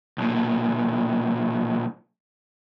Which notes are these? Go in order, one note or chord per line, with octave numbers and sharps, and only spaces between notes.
B1 A#2